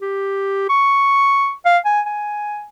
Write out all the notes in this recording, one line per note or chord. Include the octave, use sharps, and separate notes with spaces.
G4
C#6
F5
G#5
G#5